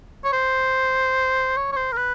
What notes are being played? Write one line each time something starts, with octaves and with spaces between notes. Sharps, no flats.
C#5
C5
C#5
C#5
C5
A#4
B4